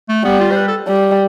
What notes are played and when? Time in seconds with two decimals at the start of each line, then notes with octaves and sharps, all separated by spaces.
0.09 A3
0.24 G3 B3
0.40 F4
0.51 C5
0.56 B4
0.68 A4
0.88 G3